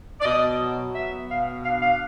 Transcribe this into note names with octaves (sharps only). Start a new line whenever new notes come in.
D5
B2 D#5
F#3
B3 E5
B2 F5
D4 F5
F5